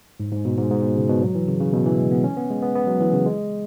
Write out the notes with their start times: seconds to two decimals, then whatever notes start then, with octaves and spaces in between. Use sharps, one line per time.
0.20 G#2
0.32 G#2
0.45 B2
0.58 G#2
0.71 G#2
0.83 B2
0.97 C#3
1.09 B2
1.22 F#3
1.35 E3
1.48 C#3
1.60 C#3
1.73 B2
1.86 E3
1.98 G#3
2.11 B3
2.24 C#4
2.37 B3
2.50 G#3
2.62 B3
2.75 B3
2.87 F#3
3.01 E3
3.13 C#3
3.26 G#3